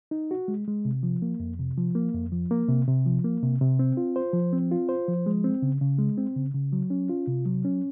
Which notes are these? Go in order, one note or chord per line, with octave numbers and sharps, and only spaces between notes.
D#4
F#4
G#3
G#3
C3
F3
A#3
F2
C3
F3
A#3
F2
F3
A#3
C3
C3
F3
A#3
C3
C3
C4
F4
C5
F3
C4
F4
C5
F3
G#3
C4
C#3
C#3
G#3
C4
C#3
C#3
F#3
C#4
F4
C3
F#3
C#4